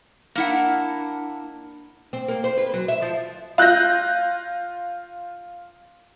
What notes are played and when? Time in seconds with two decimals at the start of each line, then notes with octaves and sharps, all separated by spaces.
0.35 A#3 D4 E4 F#5
2.13 C4
2.28 A#3
2.44 C5
2.58 B4
2.74 F#3
2.88 E5
3.02 F3
3.58 F4 F#6 G6 A#6